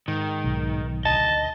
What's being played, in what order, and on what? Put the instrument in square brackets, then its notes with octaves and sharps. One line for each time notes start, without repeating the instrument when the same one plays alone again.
[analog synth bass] G#2 [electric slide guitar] D#3
[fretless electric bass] B1
[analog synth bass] D2 [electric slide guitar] D#5 [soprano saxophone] A5